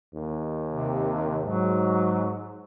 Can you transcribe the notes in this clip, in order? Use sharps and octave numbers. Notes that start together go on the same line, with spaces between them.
D#2
C3
G#2 F#3